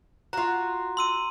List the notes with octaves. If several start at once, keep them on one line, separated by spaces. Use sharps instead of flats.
F4 F#4 A#5
C6 E6 D#7